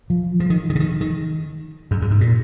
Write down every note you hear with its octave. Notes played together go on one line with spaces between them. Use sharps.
F3
F3
D#3
D#3
C#3
D#3
D#3
F#2
F#2
G#2
A#2